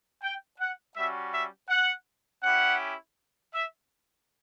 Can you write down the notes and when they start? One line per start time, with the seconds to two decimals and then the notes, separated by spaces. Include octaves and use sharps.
0.22 G5
0.59 F#5
0.96 G3 C#4 F#4 E5
1.33 E5
1.70 F#5
2.43 C#4 E4 G4 F#5
3.53 E5